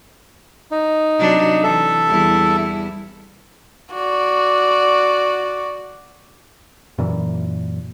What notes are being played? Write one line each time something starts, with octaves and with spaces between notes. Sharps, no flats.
D#4
C3 F#3 D4
E3 A4 E5
E2 G3 E4
F#4 D5
F#2 A#2 E3